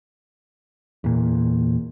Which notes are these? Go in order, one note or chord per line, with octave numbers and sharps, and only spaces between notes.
E2 A#2